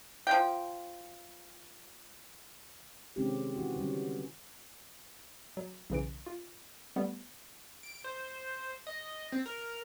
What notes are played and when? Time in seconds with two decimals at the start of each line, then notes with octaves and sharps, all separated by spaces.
0.27 F3 G5
3.16 C3 D#3 G#3 C4 C#4 G4
3.56 E3 F#4
3.76 D3 E3 G3 C#4
5.57 F#3
5.90 B1 C#3 E3 D7
6.26 F4
6.96 G3 A3 B3
7.83 D7
8.04 C5
8.87 D#5
9.32 C4
9.46 A#4